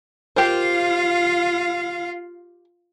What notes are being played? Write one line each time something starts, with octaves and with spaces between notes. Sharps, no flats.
F4 G4 A#4 C5 F5